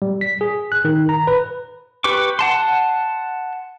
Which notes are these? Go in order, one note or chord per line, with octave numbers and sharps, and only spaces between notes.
G3
B6
G#4
F#6
D#3
A#5
B4
G4 B4 C#6 D6
F#5 A5 C6